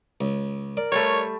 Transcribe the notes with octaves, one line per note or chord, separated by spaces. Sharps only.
C#2
A#4 D5
G3 A3 C#5